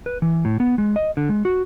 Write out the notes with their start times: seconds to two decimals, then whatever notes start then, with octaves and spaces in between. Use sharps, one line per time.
0.06 B4
0.22 E3
0.45 A2
0.60 B3
0.78 G#3
0.96 D#5
1.17 D3
1.29 G#3
1.45 F#4